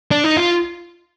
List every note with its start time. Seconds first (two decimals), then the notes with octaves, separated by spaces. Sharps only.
0.11 D4
0.24 D#4
0.37 F4